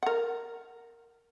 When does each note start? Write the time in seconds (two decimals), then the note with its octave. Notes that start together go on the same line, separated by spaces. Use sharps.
0.03 A#4 F#5